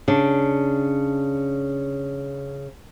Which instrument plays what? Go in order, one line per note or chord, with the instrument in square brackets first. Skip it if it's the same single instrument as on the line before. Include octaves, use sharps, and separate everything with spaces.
[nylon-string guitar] C#3 D4